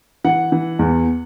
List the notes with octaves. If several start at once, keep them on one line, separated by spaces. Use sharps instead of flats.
E3 F#5
E3
E2